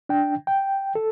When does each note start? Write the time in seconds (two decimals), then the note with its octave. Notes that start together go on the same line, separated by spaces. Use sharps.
0.09 D4 G5
0.47 G5
0.95 A4